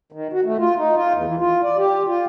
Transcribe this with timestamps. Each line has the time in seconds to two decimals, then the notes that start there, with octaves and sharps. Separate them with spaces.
0.12 D#3
0.33 F#4
0.45 A3
0.59 F4
0.77 D#4
0.96 F4
1.13 E2
1.25 E3
1.38 F4
1.63 D5
1.77 G4
2.07 F4